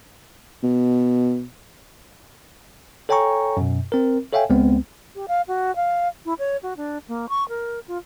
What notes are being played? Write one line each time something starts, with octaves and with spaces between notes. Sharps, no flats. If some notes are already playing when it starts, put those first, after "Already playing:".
B2
A4 C#5 G5 G#5 A#5 C#6
F#2 B2
C4 A#4
A4 C#5 E5 F5 G5 G#5
C#2 G#3 B3 C4
G4
F5
F#4
F5
E4
C#5
F#4
D4
A#3
C#6
A#4
F4